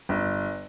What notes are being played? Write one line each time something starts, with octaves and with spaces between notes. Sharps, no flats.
G1